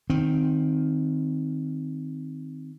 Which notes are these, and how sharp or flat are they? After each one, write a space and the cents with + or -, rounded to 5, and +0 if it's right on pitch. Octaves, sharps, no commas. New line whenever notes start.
D#3 +0 C4 +0